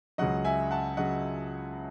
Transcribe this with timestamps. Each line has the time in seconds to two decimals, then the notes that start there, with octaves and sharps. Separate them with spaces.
0.18 C#2 C#3 F#3 D#5 F#5
0.45 E5 G#5
0.71 F#5 A5
0.97 C#3 F#3 D#5 F#5